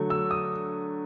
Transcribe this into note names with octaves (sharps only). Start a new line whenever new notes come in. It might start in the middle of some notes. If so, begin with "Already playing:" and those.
Already playing: D3 F#3 A3
E6
D#6